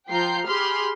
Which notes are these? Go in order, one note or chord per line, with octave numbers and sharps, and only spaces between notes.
F3 F4 G5 A#5 G6 C7
G4 G#4 B5 C6 F6